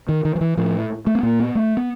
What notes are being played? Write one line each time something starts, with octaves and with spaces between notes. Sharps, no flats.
D#3
D#3
F3
E3
A2 F3
A3
B3
A#2 A#3
B3
A3
B3